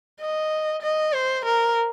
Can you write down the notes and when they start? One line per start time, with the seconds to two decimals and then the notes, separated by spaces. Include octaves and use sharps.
0.20 D#5
0.82 D#5
1.13 C5
1.45 A#4